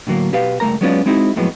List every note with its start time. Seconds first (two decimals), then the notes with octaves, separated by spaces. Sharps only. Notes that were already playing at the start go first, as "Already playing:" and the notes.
0.07 A2 D3 F#3 A#3
0.33 B2 G4 B4 F5
0.60 C#2 G2 A3 A#4 A#5
0.81 F#3 G#3 B3 C#4 D4 F4
1.06 G#3 C4 D#4 E4 F#4
1.36 F2 A2 F#3 G#3 B3